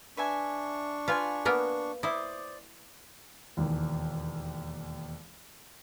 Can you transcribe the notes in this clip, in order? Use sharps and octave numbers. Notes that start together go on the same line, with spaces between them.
D4 B4 E5 G#5 C#6
F4 B4 F5 G#5
A#3 B3 A#4
E4 C5 D5 D6 D#6
E1 D#2